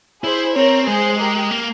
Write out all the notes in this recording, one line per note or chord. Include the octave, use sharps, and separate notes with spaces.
E4 G#4 C5
C4 A#4 C#5
G#3 G#4 C5
G4 A#4
A#3